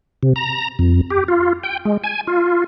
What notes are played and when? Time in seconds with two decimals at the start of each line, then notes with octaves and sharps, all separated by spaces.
0.23 C3
0.36 A#5
0.79 F2
1.10 G4
1.28 F4
1.64 G5
1.85 G#3
2.04 G#5
2.27 F4